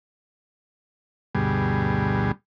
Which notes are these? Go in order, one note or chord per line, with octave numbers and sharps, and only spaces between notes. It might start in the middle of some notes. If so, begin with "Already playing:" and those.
D2 G2 B2 G3 G#4